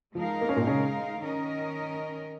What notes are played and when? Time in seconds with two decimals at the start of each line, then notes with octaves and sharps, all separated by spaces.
0.15 F3 G#3 D#4 A#4 F5
0.41 A#3
0.49 C#4
0.56 A#2 A#3
0.67 C#3 C#4
1.20 D#3 C#4 A#4 D#5